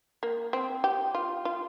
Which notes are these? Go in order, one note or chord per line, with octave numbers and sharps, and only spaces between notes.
A#3
C4
G4
F4
F4